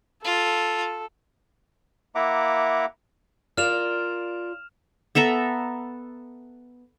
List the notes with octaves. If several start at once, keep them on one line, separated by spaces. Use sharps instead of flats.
F4 A4
A#3 E4 E5 F#5 A#5 D6
F4 A#4 D5 F6 E7 F7
B3 A4 E5 A#5